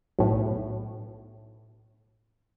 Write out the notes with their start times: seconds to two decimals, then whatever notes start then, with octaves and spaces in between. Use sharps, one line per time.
0.19 B1 A2